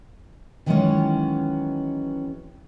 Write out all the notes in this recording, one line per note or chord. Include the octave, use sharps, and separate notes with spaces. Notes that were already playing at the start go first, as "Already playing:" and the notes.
D#3 E3 F#3 G#3 B3 C#4